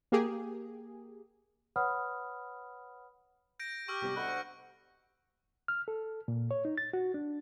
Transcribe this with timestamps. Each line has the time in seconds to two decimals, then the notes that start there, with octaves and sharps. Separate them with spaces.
0.12 A#3 G4 G#4
1.76 B4 C#5 F#5 B5 D#6 F6
3.60 G6 A#6 D7
3.88 G4 C#6 E6 F6
4.02 C3 G3 B3
4.16 D2 D#5 F#5 B5
4.28 C#6
5.68 F6
5.88 A4
6.28 A#2
6.51 C#5
6.65 D#4
6.78 A6
6.93 F#4
7.14 D4